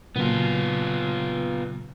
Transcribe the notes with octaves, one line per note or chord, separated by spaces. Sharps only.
A#2 C#3 F#3 B3 F4